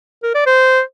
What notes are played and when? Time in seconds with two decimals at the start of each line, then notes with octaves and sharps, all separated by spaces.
0.23 A#4
0.35 D5
0.46 C5